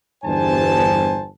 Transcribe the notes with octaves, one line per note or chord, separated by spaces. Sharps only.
G1 E2 G2 C5 G#5 A5